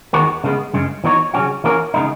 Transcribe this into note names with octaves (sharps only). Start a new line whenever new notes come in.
D#2 D#3 G#3 B3 F#4
C#3 G#3 B3
F#2 C#3 G#3
E3 B3 D#4 F#4 C#5
C#3 F#3 C#4 F#4
E3 A#3 C#4 F#4 A#4
C#3 G#3 B3 D#4